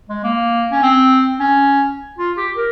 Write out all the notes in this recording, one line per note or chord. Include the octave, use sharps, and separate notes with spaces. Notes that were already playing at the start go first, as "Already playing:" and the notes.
G#3
A#3
C#4
C4
C#4
F4
G4
A#4